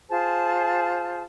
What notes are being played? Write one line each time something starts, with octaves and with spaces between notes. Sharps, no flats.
F4 G#4 C5 A5